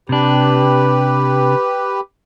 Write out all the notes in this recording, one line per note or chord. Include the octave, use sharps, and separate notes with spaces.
C3 D4 G4 B4